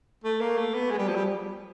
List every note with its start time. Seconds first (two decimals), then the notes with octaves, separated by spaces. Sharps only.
0.24 A3
0.41 A#3
0.57 A3
0.74 B3
0.91 G#3
0.99 G3
1.08 F3
1.16 G3